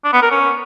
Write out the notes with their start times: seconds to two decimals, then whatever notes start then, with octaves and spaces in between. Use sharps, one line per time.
0.05 D4
0.13 B3
0.22 A#4
0.31 C#4